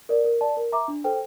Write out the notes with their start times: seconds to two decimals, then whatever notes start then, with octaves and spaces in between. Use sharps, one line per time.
0.09 A#4 D5
0.25 A#4
0.41 D5 A5
0.57 A#4
0.72 E5 A#5 D6
0.88 D4
1.04 A4 C5 G5